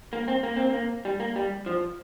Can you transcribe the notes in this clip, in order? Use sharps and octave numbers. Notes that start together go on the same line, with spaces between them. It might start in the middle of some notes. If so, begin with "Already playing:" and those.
A#3
C4
A#3
C4
A#3
G3
A#3
G3
F3